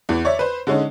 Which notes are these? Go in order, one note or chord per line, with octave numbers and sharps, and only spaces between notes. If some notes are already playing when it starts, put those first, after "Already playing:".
E2 E3
C#5 D5 E5
B4 C5
D3 G#3 C#4 D#4